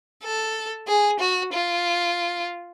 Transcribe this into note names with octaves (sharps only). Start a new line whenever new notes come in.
A4
G#4
F#4
F4